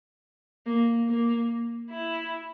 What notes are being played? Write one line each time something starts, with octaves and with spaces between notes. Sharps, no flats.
A#3
A#3
E4